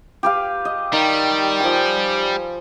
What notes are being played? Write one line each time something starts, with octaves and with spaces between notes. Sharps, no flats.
G4 B4 F5
D#5
D#3 G3
F3 G#5